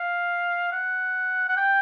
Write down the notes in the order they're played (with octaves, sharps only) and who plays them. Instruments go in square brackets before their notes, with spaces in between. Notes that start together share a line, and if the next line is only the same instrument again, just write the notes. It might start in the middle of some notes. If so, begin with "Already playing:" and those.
Already playing: [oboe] F5
F#5
F#5
G5